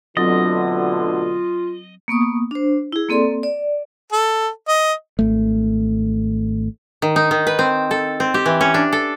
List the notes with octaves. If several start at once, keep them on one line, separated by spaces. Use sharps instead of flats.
D2 B2 D3 F#3 C4 F4 D#5
A#3 B3 C#6 D#6
D4 C5
E4 G#4
A#3 C4 A4 D5 C6
D5
A4
D#5
G#1 A3
D#3
D#4
D#3
B4
C4
A4
C4
G4
E3
C#4
D4
A4